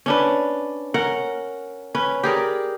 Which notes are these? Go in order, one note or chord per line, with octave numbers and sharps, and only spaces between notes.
C#4 D4 B4
C#4 A#4 F#5
C#4 B4
G4 G#4 A#4 D5